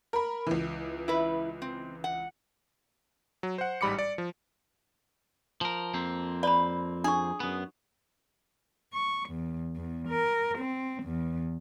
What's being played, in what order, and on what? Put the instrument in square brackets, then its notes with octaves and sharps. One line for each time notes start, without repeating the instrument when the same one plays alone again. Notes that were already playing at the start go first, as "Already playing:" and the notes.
[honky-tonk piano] A#4 B5
C#2 E3
[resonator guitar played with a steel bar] E4 B4
C4
F#5
[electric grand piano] F#3
C5 F#5
A1 G#2 G3 B5 D6 C#7
D5
F3
[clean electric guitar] F3 A#4
F2 A#3 C4
[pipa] B4 [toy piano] D5 B5
[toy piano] D4 C#6 [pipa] G#4
[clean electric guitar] F#2 B3
[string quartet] C#6
E2
E2
A#4
C4
E2